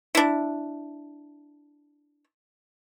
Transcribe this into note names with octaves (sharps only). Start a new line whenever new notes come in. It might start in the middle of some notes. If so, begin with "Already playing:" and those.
D4 E4